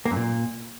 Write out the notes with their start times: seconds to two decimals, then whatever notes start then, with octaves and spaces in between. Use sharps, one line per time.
0.05 A#3
0.11 F#2
0.16 A#2